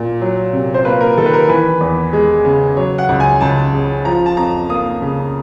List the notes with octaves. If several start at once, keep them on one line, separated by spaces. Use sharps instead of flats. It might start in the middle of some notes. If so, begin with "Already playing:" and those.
Already playing: A#2
F#3
C3
C5
A#3 B4
A#4
D#3 A4
B4
A#4
E3 B4
E2
G#3
C#3
F#3 C#5
F#5
C#2
G#5
C#2 A5
C#3
F3 A#5
A5
F2 A#5
A#3 D#6
C#3